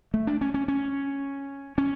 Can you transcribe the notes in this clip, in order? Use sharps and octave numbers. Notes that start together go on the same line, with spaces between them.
A3
D4
C#4
C#4
C#4
C#4